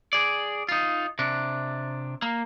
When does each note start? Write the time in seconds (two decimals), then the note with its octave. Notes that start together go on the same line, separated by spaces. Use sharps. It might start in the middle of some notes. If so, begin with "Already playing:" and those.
0.13 G#4 D5
0.69 D#4 F4
1.19 C3 D4
2.22 A#3